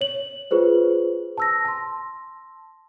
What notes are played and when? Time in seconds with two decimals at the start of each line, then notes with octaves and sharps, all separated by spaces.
0.01 C#5 F#7
0.51 F4 G#4 B4 C5
1.38 A5 E6 A#6
1.65 A5 C6